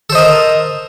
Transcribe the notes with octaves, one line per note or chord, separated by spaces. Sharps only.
A4 A#4 C5 D#5